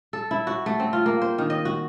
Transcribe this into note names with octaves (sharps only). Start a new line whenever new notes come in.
A4
E4
F#4
A3
C4
F4
A#3
C5
D#3
D#5
F#4